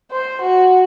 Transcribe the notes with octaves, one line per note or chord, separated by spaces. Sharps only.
C5
F#4